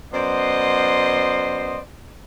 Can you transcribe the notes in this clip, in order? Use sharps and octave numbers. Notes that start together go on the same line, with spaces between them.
F#2 B3 C5 D5 D#5 C6